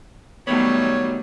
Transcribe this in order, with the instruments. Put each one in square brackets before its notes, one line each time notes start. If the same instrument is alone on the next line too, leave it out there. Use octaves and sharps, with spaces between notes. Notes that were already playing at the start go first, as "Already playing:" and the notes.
[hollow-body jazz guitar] B2 D#3 B3 [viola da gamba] F#3 G3 A3 [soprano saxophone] C#5